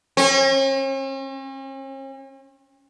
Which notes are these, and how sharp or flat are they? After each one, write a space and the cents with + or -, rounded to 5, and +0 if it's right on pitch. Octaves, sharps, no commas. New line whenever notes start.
C#4 -45